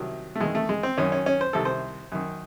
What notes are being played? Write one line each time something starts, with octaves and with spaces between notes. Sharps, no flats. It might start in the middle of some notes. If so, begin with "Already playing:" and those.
Already playing: C2 C3 D#3 F#3
A3
E2 D#3 G#3
A3
G#3
C4
F#2 D#3 C#4
C#4
C#4
C5
C2 C3 D#3 A4
C5
F#2 D#3